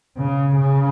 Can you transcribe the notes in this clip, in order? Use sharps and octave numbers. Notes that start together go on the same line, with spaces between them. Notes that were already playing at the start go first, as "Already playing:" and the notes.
C#3
C#3